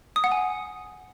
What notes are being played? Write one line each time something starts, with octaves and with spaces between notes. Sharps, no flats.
D#6
F#5
G#5